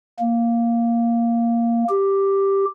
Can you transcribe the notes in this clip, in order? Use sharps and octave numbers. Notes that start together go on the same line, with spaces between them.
A#3
G4